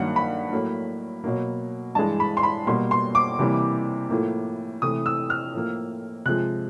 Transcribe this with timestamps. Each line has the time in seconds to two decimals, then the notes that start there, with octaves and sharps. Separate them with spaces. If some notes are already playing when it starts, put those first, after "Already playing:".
Already playing: G2 D#3 F#3 A#3 F#5
0.16 B5
0.52 A2 F#3 A#3
1.24 B2 F#3 A#3
1.95 G2 E3 G#3 A5
2.20 B5
2.37 C6
2.43 B5
2.67 B2 G3 A#3 C6
2.91 C6
3.15 D6
3.39 C3 E3 G3 A#3
4.10 A2 F3 A#3
4.82 C3 E3 A3 D#6
5.06 E6
5.30 F6
5.54 A2 F3 A#3
6.26 C3 F3 G#3 F#6